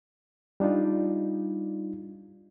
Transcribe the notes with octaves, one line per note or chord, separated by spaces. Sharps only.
G3 D4 D#4 F4